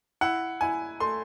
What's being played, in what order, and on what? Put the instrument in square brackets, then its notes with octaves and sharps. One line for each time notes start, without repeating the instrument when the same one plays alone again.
[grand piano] E4 F#5
E4 G#5
A3 C6